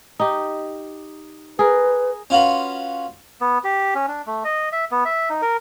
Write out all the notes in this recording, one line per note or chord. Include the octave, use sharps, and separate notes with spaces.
D#4 G4
G#4 A#4 B4
C#4 F4 F#4 B4
B3
G4
C#4
D4
A3
D#5
E5
B3
E5
D#4
A#4